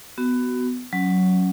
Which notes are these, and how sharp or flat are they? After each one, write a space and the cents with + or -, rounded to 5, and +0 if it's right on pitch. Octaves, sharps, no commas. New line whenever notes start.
B3 +15 F#4 +15
F#3 +0 C#4 +0